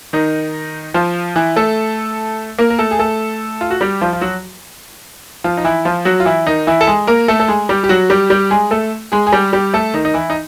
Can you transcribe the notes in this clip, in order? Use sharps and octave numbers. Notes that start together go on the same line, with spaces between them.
D#3 D#4
F3 F4
E3 E4
A3 A4
A#3 A#4
A#4
A3 A4
G#4
A3 A4
F4
F#4
G3 G4
F3 F4
F4
F#3 F#4
F3 F4
D#4
E3 E4
F3 F4
F#3 F#4
F4
E3 E4
D#3 D#4
E3 E4
A4
G#3 G#4
A#3 A#4
A3 A4
A4
G#3 G#4
G3 G4
G4
F#3 F#4
G3 G4
G3 G4
G#3 G#4
A3 A4
G#3 G#4
G#4
G3 G4
G3 G4
A3 A4
D#3 D#4
D#4
E3 E4
D#4